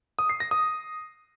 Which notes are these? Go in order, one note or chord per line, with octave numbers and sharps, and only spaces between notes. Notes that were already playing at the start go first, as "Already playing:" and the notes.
D#6
C7
A#6
D#6